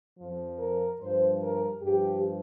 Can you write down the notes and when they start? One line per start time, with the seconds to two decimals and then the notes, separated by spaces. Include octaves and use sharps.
0.17 F2 F3
0.58 A#4
0.99 G2 F3 C5
1.40 A#4
1.82 G2 F3 G4